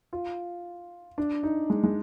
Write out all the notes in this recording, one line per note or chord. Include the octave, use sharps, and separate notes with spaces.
F4
D4
D#4
G#3
G#3